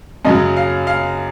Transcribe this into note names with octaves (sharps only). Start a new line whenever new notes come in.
F#2 C#3 F#3 D#5
F5
F5